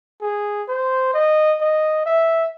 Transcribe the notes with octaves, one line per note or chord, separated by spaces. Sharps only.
G#4
C5
D#5
D#5
E5